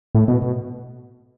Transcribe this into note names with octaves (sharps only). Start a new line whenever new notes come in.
A2
B2
B2